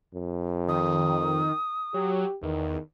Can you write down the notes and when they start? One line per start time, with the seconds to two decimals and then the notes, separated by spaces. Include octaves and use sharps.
0.14 F2
0.68 D#3 D#6
1.94 F#3 G4
2.43 E2 D#3